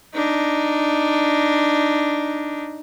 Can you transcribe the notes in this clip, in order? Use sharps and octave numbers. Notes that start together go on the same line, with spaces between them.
D4 D#4